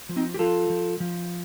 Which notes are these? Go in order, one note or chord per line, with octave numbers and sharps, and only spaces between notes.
F3
C4 D#4
G4
F3 F4 A4
F3
F3